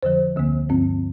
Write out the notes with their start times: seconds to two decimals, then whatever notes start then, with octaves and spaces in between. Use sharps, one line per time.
0.03 F2 D3 F3 C5
0.36 D2 D3 A#3
0.69 G2 F3 C4